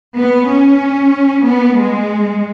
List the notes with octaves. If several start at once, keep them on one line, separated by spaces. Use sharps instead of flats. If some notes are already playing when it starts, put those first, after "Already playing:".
B3
C#4
B3
G#3